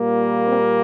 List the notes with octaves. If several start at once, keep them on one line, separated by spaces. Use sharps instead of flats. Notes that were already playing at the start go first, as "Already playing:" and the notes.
Already playing: A#2 G3 A#3
C4